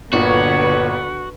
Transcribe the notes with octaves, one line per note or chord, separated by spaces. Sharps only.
G1 A#2 D3 F#4 B4 C#5